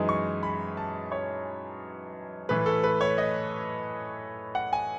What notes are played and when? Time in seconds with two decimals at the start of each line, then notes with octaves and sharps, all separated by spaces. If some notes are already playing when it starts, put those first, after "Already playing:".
Already playing: F#2 E3 G#3 D#4
0.09 C#6
0.43 B5
0.77 A5
1.12 C#5
2.49 A2 E3 A3 B4
2.66 A4
2.84 B4
3.01 C#5
3.18 D#5
4.55 F#5
4.73 G#5